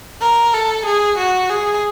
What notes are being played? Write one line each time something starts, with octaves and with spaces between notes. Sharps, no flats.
A#4
A4
G#4
F#4
G#4